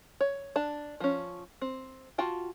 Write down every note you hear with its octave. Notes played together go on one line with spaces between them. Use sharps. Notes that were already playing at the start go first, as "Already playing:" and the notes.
C#5
D4 A5
F3 C#4
C4
F4 F#4 G5 A5